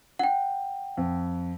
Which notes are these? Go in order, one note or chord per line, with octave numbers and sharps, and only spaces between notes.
F#5 G5
F2